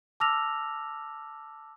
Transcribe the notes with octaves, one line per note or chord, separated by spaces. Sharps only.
A5 D6 E6 F6 A#6 F7